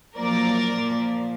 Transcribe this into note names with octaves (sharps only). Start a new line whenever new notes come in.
F#2 F3 A#3 A#4 D5
A#2 F3 A#3